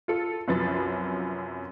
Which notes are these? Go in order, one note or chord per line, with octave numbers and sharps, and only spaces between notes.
F4 A4
C2 F#2 F3 B4 A6